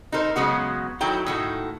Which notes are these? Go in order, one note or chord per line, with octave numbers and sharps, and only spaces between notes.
D#4 A4 A#4 C5
C#3 F#3 G#3 B3 F#4
D#3 F#3 E4 A4 G5 A#5
A2 D#3 F#4 A4